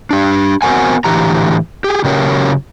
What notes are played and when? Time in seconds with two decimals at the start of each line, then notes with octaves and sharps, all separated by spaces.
0.11 D4 G4
0.62 B3 C4 F#4 A#4 F#5 G#5
1.05 A2 D3 E3 G4 A#5
1.84 G4 G#4
2.04 C#3 F#3 C#4 G4 A#4 C#5